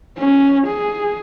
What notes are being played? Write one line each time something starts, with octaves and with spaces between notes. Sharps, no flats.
C#4
G#4